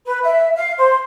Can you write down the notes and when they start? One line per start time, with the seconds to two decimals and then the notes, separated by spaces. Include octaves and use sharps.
0.07 B4
0.22 E5
0.55 F5
0.78 C5